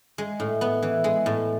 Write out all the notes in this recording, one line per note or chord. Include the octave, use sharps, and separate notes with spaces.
G#3
A2
B3
E3
G#3
A2